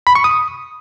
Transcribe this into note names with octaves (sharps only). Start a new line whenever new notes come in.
B5
C#6
D#6